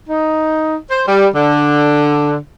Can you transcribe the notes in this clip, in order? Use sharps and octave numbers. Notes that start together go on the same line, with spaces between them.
D#4
C5
G3
D3